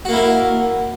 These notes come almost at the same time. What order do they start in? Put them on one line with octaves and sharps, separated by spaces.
F#4 A#3 E4 A#4